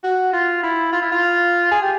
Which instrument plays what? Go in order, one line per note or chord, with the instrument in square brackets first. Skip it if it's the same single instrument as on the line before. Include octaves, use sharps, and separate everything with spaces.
[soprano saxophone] F#4
F4
E4
F4
E4
F4
G#4
G4